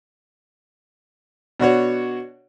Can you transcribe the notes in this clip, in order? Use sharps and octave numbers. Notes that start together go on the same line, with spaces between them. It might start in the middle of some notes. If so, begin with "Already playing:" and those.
B2 D4 F#4 C#5